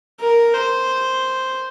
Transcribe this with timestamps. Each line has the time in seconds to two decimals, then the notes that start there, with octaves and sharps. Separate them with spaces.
0.20 A#4
0.54 C5